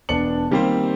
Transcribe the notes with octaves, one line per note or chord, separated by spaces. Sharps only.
E1 B3 D4 A5 C#7 F#7
D#3 G3 A#3 C4 G4 C5